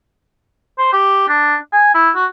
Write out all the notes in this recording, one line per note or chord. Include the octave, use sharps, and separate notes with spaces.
C5
G4
D4
G#5
E4
F#4